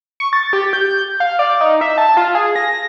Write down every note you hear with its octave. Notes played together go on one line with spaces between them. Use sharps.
C#6
A6
G4
G6
F5
D5
D#4
E5
A5
F4
G#4
A#6